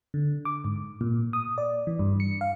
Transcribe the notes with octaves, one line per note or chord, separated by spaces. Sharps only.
D3
D6
G#2
A#2
D#6
D5
E3
G2
C#7
F5